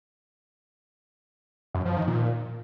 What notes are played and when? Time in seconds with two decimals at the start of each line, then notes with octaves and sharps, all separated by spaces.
1.74 F#2
1.85 F3
1.96 D#3
2.07 A#2